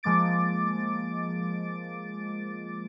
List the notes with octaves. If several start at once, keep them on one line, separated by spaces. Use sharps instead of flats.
F3 G#3 A#3 D6 A6 D7